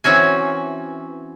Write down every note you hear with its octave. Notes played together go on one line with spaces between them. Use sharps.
E3 C4 C#4 F#4 G#5